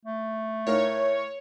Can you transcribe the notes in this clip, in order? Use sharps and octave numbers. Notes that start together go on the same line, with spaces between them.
A3
A2 A#4 C#5 F5